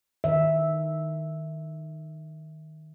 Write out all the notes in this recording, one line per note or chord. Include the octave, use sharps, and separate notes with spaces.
D#3 E5